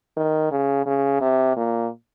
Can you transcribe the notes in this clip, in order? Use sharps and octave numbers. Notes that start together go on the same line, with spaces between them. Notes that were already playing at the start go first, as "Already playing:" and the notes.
D#3
C#3
C#3
C3
A#2